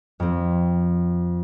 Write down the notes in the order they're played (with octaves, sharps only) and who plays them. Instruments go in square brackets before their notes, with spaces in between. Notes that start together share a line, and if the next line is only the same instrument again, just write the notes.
[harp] F2 C4